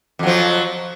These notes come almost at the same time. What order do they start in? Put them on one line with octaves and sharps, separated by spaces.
F2 F#3 F3